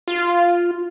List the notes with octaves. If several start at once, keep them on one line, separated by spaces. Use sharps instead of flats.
F4